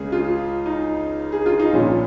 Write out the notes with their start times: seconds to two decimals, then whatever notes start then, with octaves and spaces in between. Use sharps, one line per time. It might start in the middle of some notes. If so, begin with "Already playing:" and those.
Already playing: C#2 C#3 G#4
0.12 F4
0.66 D#4
1.32 G#4
1.46 F4
1.59 D#4
1.73 A#1 A#2 C#4